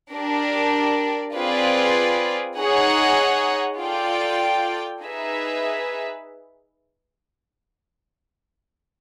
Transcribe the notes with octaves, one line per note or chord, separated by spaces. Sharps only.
D4 G4 A#4 D5
C4 F4 G#4 B4 D5
D#4 G#4 C#5 F#5
F4 A4 D5 G5
D#4 G#4 B4 E5